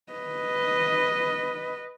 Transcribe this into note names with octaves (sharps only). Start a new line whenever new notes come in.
B4 D#5